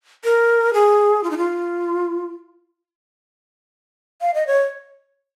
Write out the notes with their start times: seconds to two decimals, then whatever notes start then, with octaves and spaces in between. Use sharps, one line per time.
0.25 A#4
0.74 G#4
1.24 F4
1.31 D#4
1.37 F4
4.21 F5
4.34 D#5
4.47 C#5